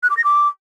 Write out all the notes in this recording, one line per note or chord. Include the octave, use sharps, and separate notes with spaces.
F#6
D6
A#6
D6